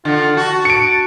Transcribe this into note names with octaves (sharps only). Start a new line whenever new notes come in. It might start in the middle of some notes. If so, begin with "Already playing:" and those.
D3 F4
F#4 A5
C#7 D7